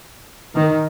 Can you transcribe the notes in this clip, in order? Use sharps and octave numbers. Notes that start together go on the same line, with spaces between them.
D#3